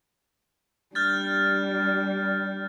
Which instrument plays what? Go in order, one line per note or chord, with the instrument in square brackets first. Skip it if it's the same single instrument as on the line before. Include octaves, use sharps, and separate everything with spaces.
[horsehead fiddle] G3 D4 [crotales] F6 G6 A6